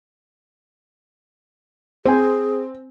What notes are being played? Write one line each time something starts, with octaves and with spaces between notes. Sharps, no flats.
C4 G#4 C5 G#5